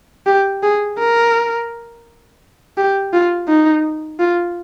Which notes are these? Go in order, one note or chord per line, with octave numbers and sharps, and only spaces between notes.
G4
G#4
A#4
G4
F4
D#4
F4